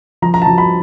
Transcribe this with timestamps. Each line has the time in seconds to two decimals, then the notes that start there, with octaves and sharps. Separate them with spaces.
0.22 F3 A#5
0.34 A#5
0.42 A5
0.46 F3 A#5
0.58 B5